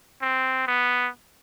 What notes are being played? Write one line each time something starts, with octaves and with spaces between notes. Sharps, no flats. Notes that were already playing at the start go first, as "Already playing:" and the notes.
C4
B3